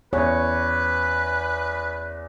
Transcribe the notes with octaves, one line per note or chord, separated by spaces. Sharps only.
E2 B4 C#5